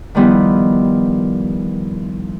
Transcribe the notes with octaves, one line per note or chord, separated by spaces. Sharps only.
D#3 F3 G3 B3 E4